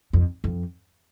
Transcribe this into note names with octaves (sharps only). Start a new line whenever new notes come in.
F2
F2